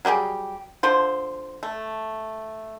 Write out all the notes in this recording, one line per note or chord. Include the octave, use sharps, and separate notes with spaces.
F#3 G3 G4 G#4
D3 F3 C5
A3